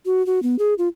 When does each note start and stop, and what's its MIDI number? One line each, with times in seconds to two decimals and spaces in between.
0.06 0.24 66
0.26 0.42 66
0.43 0.56 59
0.59 0.74 68
0.78 0.88 65